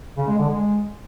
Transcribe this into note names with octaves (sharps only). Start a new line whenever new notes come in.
C#3
G#3
D3
G#3